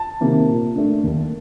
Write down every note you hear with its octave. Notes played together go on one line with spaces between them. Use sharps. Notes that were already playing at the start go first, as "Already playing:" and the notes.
Already playing: A5
C3 D#3 A#3
A#2
A3 D4
D#2